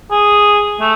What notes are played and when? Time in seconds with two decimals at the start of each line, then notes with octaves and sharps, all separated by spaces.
0.11 G#4
0.80 A3